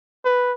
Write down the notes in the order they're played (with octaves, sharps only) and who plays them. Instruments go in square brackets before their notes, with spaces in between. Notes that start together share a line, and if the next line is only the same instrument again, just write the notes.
[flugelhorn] B4